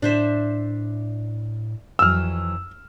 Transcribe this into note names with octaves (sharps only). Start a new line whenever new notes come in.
A2 D4 C5 E5
F2 E3 F#3 E6 F6